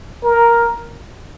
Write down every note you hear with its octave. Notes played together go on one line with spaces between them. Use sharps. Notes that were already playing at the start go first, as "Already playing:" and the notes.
A#4